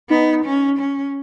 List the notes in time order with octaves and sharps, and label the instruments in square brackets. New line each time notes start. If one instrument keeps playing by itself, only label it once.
[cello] B3 [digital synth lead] D#4
[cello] C#4
C#4